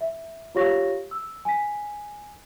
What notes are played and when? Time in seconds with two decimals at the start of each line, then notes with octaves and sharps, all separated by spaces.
0.01 E5
0.55 F4 G4 C#5 F5 C#6 A#6
1.11 E6
1.45 G#5 B6